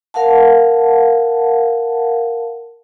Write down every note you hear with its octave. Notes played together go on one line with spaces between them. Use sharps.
A#4 F5 F#5 A5